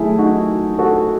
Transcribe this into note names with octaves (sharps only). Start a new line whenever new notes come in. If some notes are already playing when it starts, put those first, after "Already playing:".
Already playing: D#3 F#3 A3 E4 G#4
D#4 F#4
F#4 A4